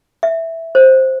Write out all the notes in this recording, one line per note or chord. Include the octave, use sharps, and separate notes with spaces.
E5
C5